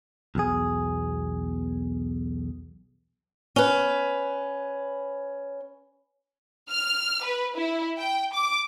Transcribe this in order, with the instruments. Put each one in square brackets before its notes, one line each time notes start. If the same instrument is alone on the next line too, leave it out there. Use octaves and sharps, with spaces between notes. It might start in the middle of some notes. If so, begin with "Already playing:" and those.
[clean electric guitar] B1 E2 G#4
[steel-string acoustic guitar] C#4 B4
[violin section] F6
B4
E4
G5
D6